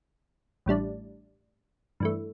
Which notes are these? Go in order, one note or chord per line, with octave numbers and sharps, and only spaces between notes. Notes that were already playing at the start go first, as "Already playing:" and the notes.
A1 A2 G3 D4
G2 E3 A3